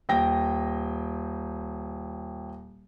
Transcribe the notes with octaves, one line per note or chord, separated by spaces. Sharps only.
D#1 G5 A#6